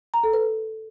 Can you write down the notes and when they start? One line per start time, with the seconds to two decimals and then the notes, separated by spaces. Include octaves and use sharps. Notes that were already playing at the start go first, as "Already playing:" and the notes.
0.14 A#5
0.24 A4
0.33 B4